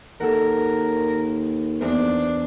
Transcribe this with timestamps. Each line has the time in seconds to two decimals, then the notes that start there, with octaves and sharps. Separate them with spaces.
0.20 D#2 A4 A#4 F#5
1.81 E2 D4 C5